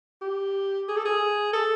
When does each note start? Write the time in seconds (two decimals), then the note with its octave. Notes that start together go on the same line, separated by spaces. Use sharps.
0.22 G4
0.88 G#4
0.96 A4
1.05 G#4
1.53 A4